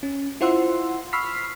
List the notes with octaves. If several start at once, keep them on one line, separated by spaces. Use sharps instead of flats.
C#4
E4 F4 C5 F#5 C6 E6
B5 C#6 E6 F6 B6 C7